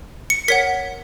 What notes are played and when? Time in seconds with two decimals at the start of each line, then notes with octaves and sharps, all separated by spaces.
0.30 C#7
0.48 A#4 C#5 F#5 B6